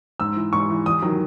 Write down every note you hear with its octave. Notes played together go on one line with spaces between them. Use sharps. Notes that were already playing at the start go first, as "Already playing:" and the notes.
G#2 E6
E3
G#2 C#6
E3
E2 D#6
D#3 F#3